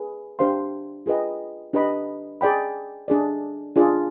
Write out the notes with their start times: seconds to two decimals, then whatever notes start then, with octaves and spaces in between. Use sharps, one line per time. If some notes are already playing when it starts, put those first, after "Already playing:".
Already playing: G#4 B4
0.39 D4 G4 C5 F5 C6
1.06 F4 G#4 B4 D#5 G5
1.73 D4 G4 B4 D#5 B5
2.41 G#4 D5 G5 B5
3.08 D4 G#4 D5
3.76 D4 F4 G#4 D5